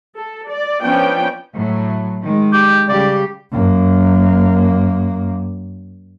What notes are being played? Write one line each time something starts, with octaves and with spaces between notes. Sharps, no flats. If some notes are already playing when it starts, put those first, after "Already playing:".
A4
D5
F3 B3 C#4 D4 G5
A2 F#3
D#3 G#3
G4
C#3 G3 G4 D5
F#2 A#3